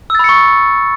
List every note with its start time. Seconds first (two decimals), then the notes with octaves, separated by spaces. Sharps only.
0.10 E6
0.15 A6
0.19 B5
0.24 C#7
0.29 C#6